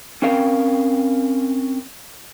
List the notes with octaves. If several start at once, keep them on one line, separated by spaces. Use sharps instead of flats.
C4 C#4 A#4 F5 G5